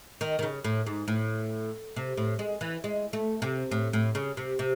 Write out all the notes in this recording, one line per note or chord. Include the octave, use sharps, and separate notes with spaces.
D#3
D#3
C#3
A2
G#2
A2
C3
A2
G#3
E3
G#3
A3
C3
A2
A2
C#3
C3
C3